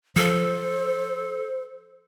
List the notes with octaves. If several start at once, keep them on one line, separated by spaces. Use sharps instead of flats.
F3 A4 C5